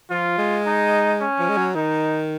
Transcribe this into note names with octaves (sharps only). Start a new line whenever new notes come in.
F3 F4
G#3
D#4
C#4
F3
G#3
F#3
D#3 D#4